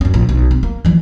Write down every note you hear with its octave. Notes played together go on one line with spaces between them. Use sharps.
F#2 C#4
A#1
B1
C4
A#3
E3 F3